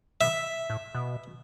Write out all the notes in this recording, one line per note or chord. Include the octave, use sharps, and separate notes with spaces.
B2 E5
A2
B2